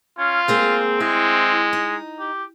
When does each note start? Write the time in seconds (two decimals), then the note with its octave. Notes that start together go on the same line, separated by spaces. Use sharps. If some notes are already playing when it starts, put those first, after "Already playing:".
0.18 C#4 F4
0.48 G#3 A#3 C4 G#4
1.00 G#3 E4
1.73 D#4
2.19 G4